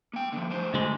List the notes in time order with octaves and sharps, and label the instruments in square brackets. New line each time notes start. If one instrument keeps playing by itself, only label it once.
[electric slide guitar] A#3 G5
D3 F3
A2 C5
[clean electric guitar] D2 G#3